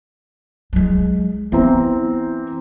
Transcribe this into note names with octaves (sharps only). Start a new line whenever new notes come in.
F#3 G#3
E3 B3 C4 A#5